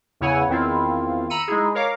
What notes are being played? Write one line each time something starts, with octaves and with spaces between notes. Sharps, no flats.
E2 C#3 E4 C#5 F#5 G#5
E2 D#3 C4 E4 F4
A#5 B5 E6 C#7 D#7
G#3 D#4 E4 G#4
A#4 C#5 F5 A#5 D6